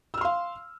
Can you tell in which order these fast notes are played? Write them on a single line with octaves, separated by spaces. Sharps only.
E6 F6 C6 F5